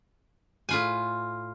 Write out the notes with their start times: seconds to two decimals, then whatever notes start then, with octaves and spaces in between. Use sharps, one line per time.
0.69 A2 F4 G#5